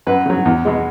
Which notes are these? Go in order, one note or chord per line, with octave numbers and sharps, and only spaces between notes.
F#2 B4
C#3 F#3
E2
B2 G#3